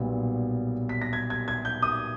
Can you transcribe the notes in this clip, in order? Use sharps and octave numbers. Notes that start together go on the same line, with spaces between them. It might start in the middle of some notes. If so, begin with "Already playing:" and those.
Already playing: B1 A#2 G3 B3
B6
A#6
G#6
G#6
G#6
G6
D#6